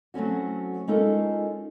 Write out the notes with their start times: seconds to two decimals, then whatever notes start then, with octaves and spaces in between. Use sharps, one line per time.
0.14 F#3 A3 C4 C#4 F#4
0.88 G#3 C#4 D#4 F4 A4 A#4